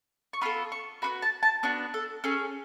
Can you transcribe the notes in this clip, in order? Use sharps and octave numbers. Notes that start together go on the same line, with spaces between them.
C#6
B3 F4 A4 B5
C#6
B3 D4 F#4 B5
A5
A5
B3 D4 F#4
A4
C#4 G#4 A4